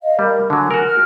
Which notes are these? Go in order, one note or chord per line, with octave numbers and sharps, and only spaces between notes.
D#5 F5
G3 A#4
D3 F#3 G#5
F#4 A#4
F6